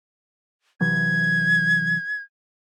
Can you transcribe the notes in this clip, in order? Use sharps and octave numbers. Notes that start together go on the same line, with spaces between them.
C3 E3 F#3 G#6